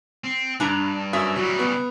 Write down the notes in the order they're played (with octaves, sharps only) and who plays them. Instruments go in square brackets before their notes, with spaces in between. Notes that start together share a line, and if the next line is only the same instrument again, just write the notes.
[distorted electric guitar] C4
[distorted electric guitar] G2 [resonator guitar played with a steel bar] D4 A#5
[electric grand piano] F#2 C#4 D#6 [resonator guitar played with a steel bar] E5
[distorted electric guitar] C#3 G3 [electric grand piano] F#3
[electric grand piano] B3